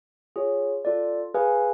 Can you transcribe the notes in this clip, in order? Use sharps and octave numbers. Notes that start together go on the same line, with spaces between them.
F4 G#4 C#5
F4 A4 D5
G#4 B4 F5 G#5